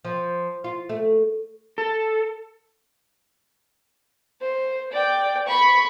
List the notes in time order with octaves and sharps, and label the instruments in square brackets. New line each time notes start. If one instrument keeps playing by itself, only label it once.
[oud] F3
F4
A3
[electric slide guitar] A4
[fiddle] C5
D5 G5
B5 C#6